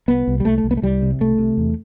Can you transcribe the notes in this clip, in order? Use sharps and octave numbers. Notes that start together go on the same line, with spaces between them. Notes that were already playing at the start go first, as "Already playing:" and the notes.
C2 B3
C2
G3
C2 A3
A3
C2
B3
A3
C2 G3
C3
C2 A3
C3
E2